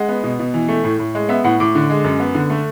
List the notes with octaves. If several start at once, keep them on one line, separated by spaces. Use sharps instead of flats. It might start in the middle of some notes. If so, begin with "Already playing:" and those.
Already playing: G#3 F#5
B3
B2
B2
E3
A3
A2
A2
G#3
B3 E5
A2 F#5
A2 D6
D3
G#3
F#2
B3
D3
A3